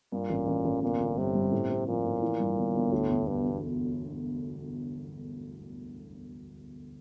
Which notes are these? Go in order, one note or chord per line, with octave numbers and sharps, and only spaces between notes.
G2 A#2
A1
A1
A1
G1 A#2
G1
G2 C3
G2
A2
C4
A#2 F3
A2
E3
G2
G1
G1
D2 A2
E1
E1 G2
E1